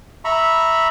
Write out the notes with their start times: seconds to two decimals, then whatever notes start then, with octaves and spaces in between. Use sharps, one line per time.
0.25 E5 A#5 B5 C#6